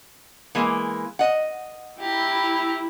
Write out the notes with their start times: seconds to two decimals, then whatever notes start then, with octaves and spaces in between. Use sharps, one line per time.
0.55 E3 G#3 A#3
1.19 D#5 F#5
2.00 E4 G4 A#5